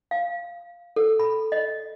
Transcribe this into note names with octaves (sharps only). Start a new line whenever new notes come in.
F5
A4
B5
D#5